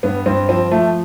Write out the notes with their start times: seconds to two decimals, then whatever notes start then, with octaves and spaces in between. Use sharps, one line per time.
0.03 G2 B3
0.26 G2 C4
0.49 F3 C4
0.71 F3 A3